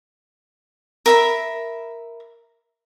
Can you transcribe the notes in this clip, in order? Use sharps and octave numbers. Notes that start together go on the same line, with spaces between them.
A#4 E5 B5